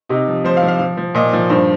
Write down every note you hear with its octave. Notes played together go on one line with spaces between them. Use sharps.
C3 D#4
F3
F3 C5
F5
F3
F5
F3
F3
A#2 D#5
F3
G2 C5